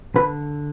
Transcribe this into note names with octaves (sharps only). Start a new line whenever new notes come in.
D3 B4